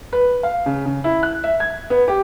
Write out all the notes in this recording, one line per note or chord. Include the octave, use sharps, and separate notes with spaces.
B4
F5
C#3
C#3
E4
F#6
E5
G#6
B3
G4